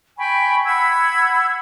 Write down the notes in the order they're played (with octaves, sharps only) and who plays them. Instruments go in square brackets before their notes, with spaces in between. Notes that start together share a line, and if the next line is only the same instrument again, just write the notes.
[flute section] G5 G#5 B5 C#6
F#5 B5 E6 G#6